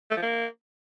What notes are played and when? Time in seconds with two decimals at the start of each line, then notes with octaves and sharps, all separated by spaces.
0.11 A3
0.16 F3
0.22 A#3